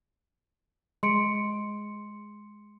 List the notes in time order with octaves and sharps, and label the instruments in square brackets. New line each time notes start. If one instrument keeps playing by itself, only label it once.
[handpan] G#3 [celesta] C6 C#7 D7